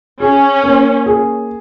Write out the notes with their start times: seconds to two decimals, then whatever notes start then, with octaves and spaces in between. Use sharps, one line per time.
0.20 C#4 G#4
0.63 A#3
1.06 G#4